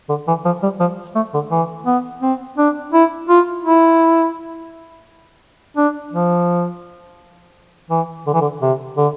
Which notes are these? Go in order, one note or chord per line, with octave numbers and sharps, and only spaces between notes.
D3
E3
F3
G3
F3
A3
D3
E3
B3
C4
D4
E4
F4
E4
D4
F3
E3
D3
E3
D3
C3
D3